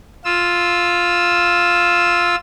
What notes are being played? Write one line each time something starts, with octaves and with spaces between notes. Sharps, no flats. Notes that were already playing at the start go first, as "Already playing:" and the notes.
F4 E6